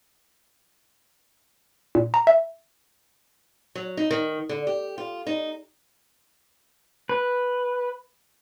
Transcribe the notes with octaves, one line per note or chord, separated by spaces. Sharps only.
A#2
A#5
E5
F#3
D#4
D#3
D3
G4
F4
D#4
B4